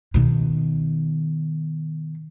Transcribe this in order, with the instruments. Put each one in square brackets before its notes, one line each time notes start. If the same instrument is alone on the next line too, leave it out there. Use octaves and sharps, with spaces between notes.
[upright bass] B2 D#3